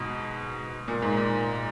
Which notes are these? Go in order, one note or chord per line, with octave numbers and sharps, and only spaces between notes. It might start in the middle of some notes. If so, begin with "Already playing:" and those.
Already playing: G#2 B2
A#2
G#2
A#2